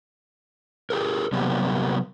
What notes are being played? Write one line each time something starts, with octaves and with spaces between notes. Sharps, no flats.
G4 G#4 A#4
C3 F#3 G3 A#3 B3